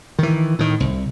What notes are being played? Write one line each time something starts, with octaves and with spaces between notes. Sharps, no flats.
D#3 E3
A2 D#3
C2